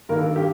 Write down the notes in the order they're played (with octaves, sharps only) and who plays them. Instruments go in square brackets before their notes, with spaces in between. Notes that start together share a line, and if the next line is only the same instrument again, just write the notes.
[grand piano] G2 D#3 A#3 A#4
A4
G4